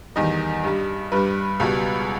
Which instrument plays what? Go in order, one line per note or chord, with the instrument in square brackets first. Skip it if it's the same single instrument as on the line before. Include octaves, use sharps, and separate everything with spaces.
[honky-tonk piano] E2 D#3 G3 D#5
G2 G3
G2 G3 B4
C#2 B2 G3